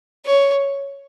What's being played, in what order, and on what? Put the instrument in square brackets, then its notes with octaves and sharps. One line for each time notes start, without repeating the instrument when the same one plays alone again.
[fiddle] C#5